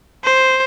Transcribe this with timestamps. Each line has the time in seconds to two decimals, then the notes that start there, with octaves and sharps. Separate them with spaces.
0.24 C5